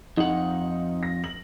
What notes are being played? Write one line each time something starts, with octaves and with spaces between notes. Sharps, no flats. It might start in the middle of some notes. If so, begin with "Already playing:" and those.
F2 D#4 F#5
A#6
F#7